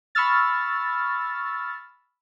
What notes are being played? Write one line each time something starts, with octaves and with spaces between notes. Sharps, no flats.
B5 C#6 E6 F6 A6